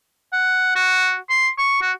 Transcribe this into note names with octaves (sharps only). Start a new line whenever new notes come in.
F#5
F#4
C6
C#6
F#4